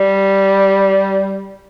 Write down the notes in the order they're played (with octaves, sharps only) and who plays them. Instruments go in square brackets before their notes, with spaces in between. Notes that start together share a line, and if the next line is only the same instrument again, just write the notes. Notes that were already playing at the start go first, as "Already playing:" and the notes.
Already playing: [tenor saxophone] G3